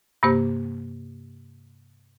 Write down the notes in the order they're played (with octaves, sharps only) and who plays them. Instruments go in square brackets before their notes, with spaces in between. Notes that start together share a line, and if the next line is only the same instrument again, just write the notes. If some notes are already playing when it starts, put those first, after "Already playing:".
[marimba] G2 C3 A#3 G4 C5